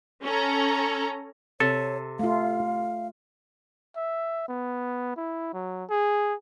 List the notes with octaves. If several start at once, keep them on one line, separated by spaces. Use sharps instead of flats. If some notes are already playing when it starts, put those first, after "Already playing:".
C#4 A4 A#5
C3 A4 C#5
A3 F4 F5
E5
B3
E4
F#3
G#4